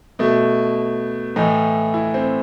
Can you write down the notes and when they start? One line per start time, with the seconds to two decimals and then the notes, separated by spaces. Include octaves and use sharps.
0.19 B2 A3
1.36 A2 E3 D#4
1.94 E4
2.14 C4